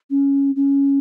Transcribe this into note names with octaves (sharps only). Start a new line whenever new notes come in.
C#4
C#4